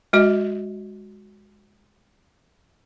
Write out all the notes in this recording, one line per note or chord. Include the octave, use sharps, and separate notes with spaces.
G#3 F#4 D#5